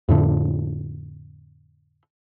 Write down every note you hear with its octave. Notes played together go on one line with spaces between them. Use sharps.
F2 A2 D3